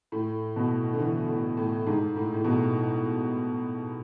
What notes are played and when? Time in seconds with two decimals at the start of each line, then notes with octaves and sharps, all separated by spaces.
0.12 A2
0.56 B2
0.93 D3
0.99 E3
1.28 A2
1.57 A2
1.86 G#2
2.16 A2
2.34 A2
2.44 B2